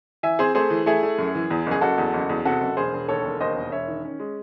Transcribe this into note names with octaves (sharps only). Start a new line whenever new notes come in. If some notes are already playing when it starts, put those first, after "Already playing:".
E3 E5 G#5
C4 G#4 C5
A3 G#4 C5
E3
A3 E4 G#4
A3
F#2
E3
E2
F#1 G#4
F#1 F#4 A4
E2
F#1
E2
C3 F#4 A4
F#1
E1 G#4 C5
E1
D#2 A4 C#5
E1
D#2 C5 D#5
E1
E1 C#5 E5
D#3
C#4
G#3